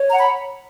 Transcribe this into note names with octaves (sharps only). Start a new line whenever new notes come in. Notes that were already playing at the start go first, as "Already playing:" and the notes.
Already playing: C#5
F#5 A#5
B5